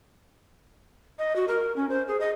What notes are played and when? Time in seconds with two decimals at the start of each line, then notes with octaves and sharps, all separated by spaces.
1.19 D#5
1.36 F#4
1.48 A#4
1.76 C#4
1.90 C5
2.08 G#4
2.20 D#5